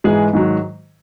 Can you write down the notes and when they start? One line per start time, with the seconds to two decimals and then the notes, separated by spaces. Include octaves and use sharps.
0.04 G#2 E3 G#3 G#4
0.33 G#2 D#3 F#3